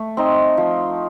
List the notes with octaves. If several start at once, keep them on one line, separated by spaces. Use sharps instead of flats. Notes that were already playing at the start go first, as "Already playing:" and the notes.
Already playing: A3
C4 D#4
F3